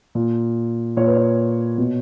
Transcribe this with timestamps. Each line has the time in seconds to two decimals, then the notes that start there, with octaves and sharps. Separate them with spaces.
0.15 A#2
0.97 A#2 C#5
1.07 B4
1.17 C#5
1.78 B2